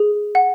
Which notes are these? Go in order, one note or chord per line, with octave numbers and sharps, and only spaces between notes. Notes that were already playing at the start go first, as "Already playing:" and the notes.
Already playing: G#4
F#5